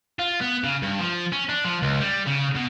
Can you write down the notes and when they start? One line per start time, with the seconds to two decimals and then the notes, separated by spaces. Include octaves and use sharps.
0.19 F4
0.41 B3
0.64 C#3
0.82 G2
0.99 F3
1.32 C#4
1.49 D4
1.64 F3
1.82 C#2
2.00 G3
2.26 C#3
2.55 B2